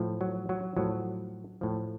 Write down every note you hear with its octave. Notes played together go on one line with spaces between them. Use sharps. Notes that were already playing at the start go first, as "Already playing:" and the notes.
Already playing: A2 F3
F#3
F#3
A2 F3 F#3
A2 F3